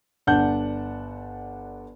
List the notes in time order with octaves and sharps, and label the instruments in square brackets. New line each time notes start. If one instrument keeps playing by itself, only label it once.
[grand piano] G1 D4 F#5 A5 G6